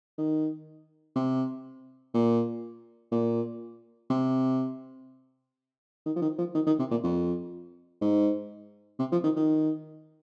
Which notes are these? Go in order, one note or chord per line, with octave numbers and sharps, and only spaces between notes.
D#3
C3
A#2
A#2
C3
D#3
F3
D#3
F3
D#3
D#3
C3
A#2
F2
G#2
C3
F3
D#3
D#3